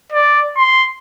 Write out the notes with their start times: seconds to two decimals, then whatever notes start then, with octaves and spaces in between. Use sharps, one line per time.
0.12 D5
0.57 C6